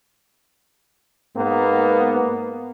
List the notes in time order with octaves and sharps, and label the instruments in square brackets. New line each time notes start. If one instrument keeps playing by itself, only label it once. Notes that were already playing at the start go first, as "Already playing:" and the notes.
[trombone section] G#2 A#3 B3